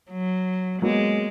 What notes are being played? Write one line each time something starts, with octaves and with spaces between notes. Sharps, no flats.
F#3
F#3 G#3 A#3 B3